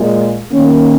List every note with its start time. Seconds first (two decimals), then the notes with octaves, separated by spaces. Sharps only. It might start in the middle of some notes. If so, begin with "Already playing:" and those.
Already playing: A#2 G#3 F4
0.50 D#3 A#3 C#4